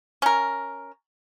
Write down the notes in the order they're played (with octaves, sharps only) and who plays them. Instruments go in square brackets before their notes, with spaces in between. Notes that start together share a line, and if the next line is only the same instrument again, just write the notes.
[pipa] C#4 A#4